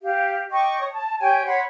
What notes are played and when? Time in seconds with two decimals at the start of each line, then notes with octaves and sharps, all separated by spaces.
0.02 G4 F5
0.51 D#5 G5 C#6 D6
0.80 C#5 D#6
0.92 A5
1.20 G4 C#5 G5 G#5
1.46 C#5 F#5 B5 C6